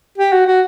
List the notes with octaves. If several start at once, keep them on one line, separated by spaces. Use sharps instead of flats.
G4
F#4
F#4